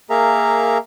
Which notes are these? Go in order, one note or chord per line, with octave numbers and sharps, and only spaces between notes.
A#3 G#4 A#4 E5 F5 A#5